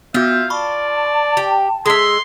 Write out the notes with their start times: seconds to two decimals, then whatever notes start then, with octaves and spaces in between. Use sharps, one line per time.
0.14 B3 F4 F#4 E5 G6
0.50 D5 A5 B5 C#6
1.37 G4
1.86 G#3 E5 C6 D#6 G#6